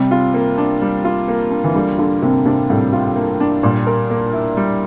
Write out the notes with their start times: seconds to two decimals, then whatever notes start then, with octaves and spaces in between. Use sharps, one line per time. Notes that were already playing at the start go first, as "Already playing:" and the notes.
Already playing: C3 G3
0.11 F4
0.34 A#3
0.58 D4
0.82 G3
1.05 F4
1.28 A#3
1.51 D4
1.64 E3
1.75 D3 G3
1.98 D3 F4
2.22 C3 A#3
2.45 C3 D4
2.69 A2 G3
2.93 F4
3.16 A#3
3.40 D4
3.63 A#2 G3
3.87 A#4
4.10 A#3
4.33 E4
4.57 G3